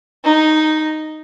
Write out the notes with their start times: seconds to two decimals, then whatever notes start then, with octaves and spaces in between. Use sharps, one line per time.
0.24 D#4